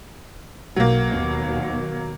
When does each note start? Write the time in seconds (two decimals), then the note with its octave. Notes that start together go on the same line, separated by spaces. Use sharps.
0.76 B1 F#3 A#3
1.10 D#2 B2